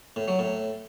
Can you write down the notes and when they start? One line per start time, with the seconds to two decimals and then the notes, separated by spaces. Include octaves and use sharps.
0.16 A2
0.28 F#3
0.39 A2